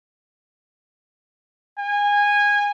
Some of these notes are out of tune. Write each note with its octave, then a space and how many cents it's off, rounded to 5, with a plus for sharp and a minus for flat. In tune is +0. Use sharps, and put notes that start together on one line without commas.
G#5 -20